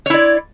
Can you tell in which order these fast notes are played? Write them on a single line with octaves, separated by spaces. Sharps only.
C#5 E4 D5